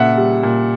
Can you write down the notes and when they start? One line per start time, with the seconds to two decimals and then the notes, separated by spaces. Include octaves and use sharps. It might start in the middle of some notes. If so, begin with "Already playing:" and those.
Already playing: A#2 C#3 E5 F#5
0.17 G3
0.43 A#2